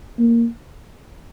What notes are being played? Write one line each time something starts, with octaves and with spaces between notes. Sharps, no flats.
A#3